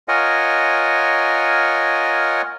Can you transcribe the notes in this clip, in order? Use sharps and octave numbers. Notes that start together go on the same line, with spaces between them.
F4 A#4 C#5 D#5 F#5 G#5